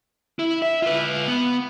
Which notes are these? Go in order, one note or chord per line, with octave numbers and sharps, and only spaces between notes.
E4
E5
F4 B4
B3